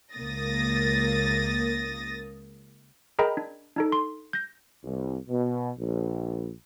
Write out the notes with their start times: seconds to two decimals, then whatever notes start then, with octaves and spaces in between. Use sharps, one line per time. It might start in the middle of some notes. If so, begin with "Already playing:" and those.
0.14 C#2 A#3 D#6 A6 A#6
3.19 G#4 A#4 D#5 G5 A#5 B5
3.37 D4
3.76 D4 D#4 A4
3.92 C6
4.33 G6 A#6
4.84 C2
5.29 B2
5.78 A#1